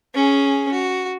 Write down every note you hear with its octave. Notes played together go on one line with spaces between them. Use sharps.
C#4 G#4
F#4